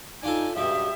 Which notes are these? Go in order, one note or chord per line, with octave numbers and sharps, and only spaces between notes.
D4 D#4 F4 A4 G#5
C#2 G2 B2 G4 E5 D#6